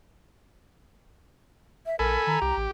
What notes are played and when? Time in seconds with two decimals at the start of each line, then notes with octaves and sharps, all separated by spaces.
1.86 E5
1.99 A#1 A4 A#4 G#5 B5
2.27 D#3 A#5
2.41 C2 G4
2.57 A1